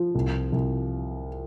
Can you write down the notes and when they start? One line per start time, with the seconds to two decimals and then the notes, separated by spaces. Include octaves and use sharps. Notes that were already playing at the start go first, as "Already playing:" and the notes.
Already playing: F3
0.15 C2
0.52 C2